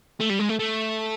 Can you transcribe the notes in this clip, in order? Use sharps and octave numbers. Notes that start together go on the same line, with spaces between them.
A3
G3
G#3
A3
A3